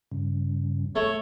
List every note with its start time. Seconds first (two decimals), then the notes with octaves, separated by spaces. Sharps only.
0.12 G2 C#3
0.96 A3 C#5